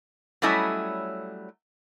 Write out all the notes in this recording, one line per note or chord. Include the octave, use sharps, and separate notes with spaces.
F#3 G3 A3 C#4 E4 D#5